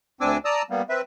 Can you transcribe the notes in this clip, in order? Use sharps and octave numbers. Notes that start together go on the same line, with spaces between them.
D2 C4 D4 G#5 D6 E6
D5 A5 A#5 D#6 E6
G3 A#3 B3
C4 B4 E5